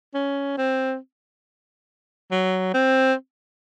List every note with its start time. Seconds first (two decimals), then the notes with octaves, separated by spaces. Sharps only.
0.14 C#4
0.58 C4
2.31 F#3
2.74 C4